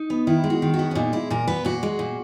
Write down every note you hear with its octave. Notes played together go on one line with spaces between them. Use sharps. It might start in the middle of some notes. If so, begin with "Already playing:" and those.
Already playing: D#4
B3
D#3 E4
G#3
F#4
D#3
F#4
B3
C#4
A#2 D#4
G#3 E4
A#2 A#4
B3 B4
A#2 F#4
G#3
A#2